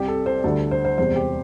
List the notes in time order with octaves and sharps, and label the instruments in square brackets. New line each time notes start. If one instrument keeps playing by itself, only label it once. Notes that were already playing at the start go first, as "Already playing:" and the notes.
Already playing: [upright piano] C2 C3 G3 G4
A4
C5
D2 D3 G3 A4
C5
C5
E1 E2 C3 G3 C5
G4